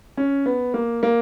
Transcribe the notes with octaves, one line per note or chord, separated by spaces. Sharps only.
C#4
B3
A#3
A#3